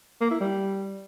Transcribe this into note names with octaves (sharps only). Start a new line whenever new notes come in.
A#3
E4
G3